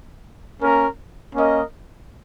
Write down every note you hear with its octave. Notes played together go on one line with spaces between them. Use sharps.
A#3 C#4 A#4
A#3 C#4 A#4 D#5